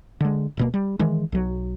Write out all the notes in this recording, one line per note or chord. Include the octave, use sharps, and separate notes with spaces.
D3 G#3
D1 B2 A#3
G3
D#3 E3 G#3
B1 F#3